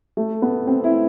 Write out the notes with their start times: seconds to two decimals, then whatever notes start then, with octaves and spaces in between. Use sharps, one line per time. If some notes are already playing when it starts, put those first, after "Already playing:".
0.17 A3
0.42 B3
0.67 C4
0.84 E4